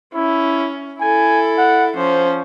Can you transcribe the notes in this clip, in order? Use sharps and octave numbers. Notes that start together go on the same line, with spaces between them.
C#4 E4
E4 A4 G#5
F#5
F3 C#4 C5